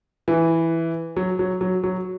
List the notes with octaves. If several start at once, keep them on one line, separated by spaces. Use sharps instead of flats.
E3
F#3
F#3
F#3
F#3